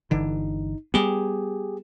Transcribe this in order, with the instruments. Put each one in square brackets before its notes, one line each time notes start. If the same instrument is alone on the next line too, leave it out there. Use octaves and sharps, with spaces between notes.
[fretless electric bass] G1 D3 E3 [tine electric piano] D#4
[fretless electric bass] G3 B3 [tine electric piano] G4 G#4